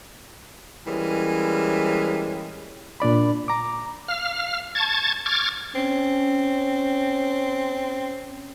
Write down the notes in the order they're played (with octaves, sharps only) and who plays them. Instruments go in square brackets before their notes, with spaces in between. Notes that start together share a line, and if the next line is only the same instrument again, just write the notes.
[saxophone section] E3 G3 G#3 A#3 C#4
[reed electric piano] A#2 D4 D5 B5
A#5 D6
[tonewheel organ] F5 F6
A5 C#6 G#6 A6
C#6 D6 F6 G#6 A6
[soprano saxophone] C4 [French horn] C#4